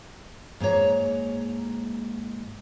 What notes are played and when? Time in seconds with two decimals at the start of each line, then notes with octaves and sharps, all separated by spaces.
0.60 G#2 A#3 A#4 C#5 A#5